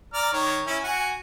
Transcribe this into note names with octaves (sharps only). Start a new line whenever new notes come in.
D5 A#5 F6
D#3 C#5
C#4 E4
F#4 F#5 G#5